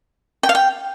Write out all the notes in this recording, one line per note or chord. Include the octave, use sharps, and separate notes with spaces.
G5
F5
G5